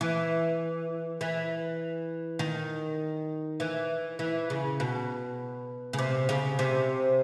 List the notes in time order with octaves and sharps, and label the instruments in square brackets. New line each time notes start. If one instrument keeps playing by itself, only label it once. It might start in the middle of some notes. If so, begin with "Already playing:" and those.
[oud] E3
E3
D#3
E3
E3
C#3
B2
C#3
C3
C#3
C3